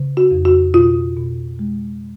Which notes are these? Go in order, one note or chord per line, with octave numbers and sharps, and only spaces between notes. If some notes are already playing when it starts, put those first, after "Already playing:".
Already playing: C#3
F#4
F2
F#4
B2 F4
B2
G#3